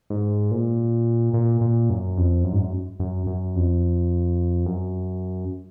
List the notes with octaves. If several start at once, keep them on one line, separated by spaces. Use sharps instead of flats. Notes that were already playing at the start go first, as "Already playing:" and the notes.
G#2
A#2
A#2
A#2
F#2
F2
F#2
G#2
F#2
F#2
F#2
F2
F#2